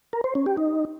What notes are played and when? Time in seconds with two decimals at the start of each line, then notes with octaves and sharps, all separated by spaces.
0.13 A#4
0.24 C5
0.35 C#4
0.46 G4
0.57 D#4